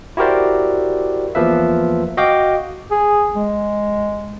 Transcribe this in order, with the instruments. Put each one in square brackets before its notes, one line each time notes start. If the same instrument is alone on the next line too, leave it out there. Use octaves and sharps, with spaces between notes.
[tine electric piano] E4 F#4 G4 A#4 C5 D5
E2 F3 A#3 B4 E5
F#4 D#5 F5 G5 D6
[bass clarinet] G#4
G#3